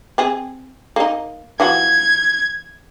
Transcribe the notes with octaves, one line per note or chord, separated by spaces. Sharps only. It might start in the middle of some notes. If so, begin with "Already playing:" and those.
C4 G#4
A#3 D#4
E3 F3 F#4 G#6